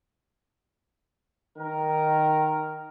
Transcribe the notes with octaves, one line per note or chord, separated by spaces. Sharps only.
D#3 A#4